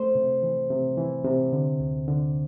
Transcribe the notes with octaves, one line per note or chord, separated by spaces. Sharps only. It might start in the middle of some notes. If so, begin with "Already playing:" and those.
Already playing: A3 C5
C3
E3
C3
E3
C3
D3
D2
D3